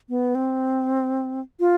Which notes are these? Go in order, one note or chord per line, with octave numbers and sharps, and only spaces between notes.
B3
C4
F4